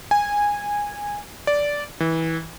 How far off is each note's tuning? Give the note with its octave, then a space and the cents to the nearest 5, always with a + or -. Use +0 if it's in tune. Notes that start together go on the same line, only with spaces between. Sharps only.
G#5 -15
D5 -10
E3 -20